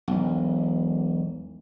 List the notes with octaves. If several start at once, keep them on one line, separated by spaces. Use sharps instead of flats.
E1 B1